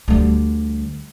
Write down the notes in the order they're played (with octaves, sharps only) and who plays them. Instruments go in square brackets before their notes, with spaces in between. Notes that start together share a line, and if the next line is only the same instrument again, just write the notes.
[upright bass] D2 G3